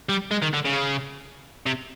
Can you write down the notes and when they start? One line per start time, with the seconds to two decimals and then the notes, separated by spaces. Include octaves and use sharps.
0.09 G3
0.31 G#3
0.43 D#3
0.54 D3
0.65 C#3
1.66 C3